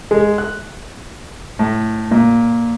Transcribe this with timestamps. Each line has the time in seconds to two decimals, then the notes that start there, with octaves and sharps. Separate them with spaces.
0.11 G#3
0.38 F#6
1.59 A2
2.11 A#2